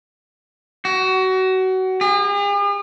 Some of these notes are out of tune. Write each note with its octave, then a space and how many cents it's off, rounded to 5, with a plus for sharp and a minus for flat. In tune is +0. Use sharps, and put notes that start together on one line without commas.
F#4 +25
G#4 -45